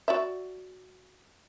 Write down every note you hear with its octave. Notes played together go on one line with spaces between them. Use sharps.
F#4 D5 E5